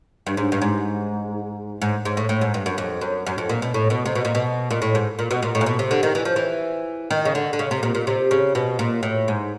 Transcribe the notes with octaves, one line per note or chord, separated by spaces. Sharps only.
G2
G#2
G2
G#2
G#2
G#2
A2
A2
G#2
G2
F#2
F2
F#2
F#2
F2
A#2
B2
A2
B2
C3
B2
A#2
B2
A#2
A2
G#2
A#2
B2
A#2
A2
A#2
B2
C3
D3
D#3
E3
F3
E3
D#3
C#3
D3
D3
C#3
C3
A#2
A#2
C3
C#3
B2
A#2
A2
G#2